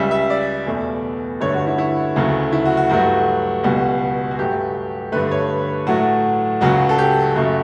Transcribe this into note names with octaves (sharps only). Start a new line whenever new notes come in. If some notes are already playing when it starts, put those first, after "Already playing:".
Already playing: C#2 C#3 G3 E5
E5
D5
E2 B2 A3
G2 D3 A3 C#5
F#4
E4
E4
D2 C#3 F#3 A3
E4
F#4
F#4
G2 F#3 A3 F#4
C#2 B2 G3 F#4
F#4
G2 F#3 A3 G4
G2 D3 A3 B4
C#5
A2 F#3 A3 F#4
C#2 C#3 F#3 F#4
A4
G4
F#2 C#3 F#3 A3